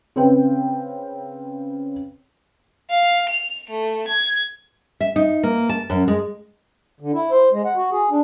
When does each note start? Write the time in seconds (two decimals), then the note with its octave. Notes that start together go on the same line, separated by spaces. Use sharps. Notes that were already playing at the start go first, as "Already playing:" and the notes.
0.16 C#3 C4 B4 G5
2.91 F5
3.29 F7
3.70 A3
4.08 G#6
5.00 E5
5.16 D#4
5.43 A#3
5.69 A5
5.90 F#2
6.08 G#3
7.00 D3
7.14 E4
7.31 C5
7.53 G#3
7.65 F#5
7.76 F#4
7.91 G#4
8.10 D4